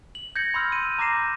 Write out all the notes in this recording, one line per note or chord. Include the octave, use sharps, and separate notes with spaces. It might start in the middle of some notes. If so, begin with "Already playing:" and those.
F#7
G6 G#6 A#6 C#7
B5 C6 E6 F6
D#7
A#5 D6 G6 A#6 C7 E7